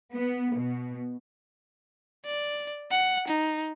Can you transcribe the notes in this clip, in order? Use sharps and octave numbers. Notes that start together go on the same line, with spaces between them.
B3
B2
D5
F#5
D#4